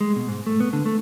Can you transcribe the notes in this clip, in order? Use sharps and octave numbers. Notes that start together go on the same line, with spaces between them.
G#3
B2
G#2
A3
B3
D3
A3